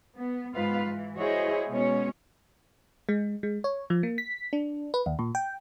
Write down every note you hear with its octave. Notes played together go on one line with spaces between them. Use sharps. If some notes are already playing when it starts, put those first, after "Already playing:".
B3
G#2 B3 F4 B4 F5
E3
E4 F#4 G#4 C5 C#5 D#5
B2 G#3 C#4 C#5
G#3
G#3
C#5
F3
A#3
B6
D4
B4
D#2
A#2
G5